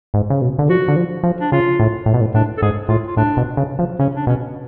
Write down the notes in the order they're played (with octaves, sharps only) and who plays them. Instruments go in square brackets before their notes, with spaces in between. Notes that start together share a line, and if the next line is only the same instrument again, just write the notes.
[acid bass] G#2
C#3
B2
D3
[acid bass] F3 [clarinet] F#4
[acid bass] D3
F3
F3
[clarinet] D4
[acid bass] C#3 [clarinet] F4
[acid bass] A2
A2
B2
A2
[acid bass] A2 [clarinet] D4
[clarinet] A4
[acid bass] G#2 [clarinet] G#4
[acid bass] A2 [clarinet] F4
[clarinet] F4
[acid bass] A2 [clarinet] D4
[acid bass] B2
C#3
F3
[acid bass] C#3 [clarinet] C#4
[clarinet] D4
[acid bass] B2 [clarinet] C#4